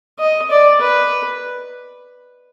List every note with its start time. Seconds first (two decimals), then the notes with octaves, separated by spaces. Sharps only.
0.19 D#5
0.51 D5
0.81 B4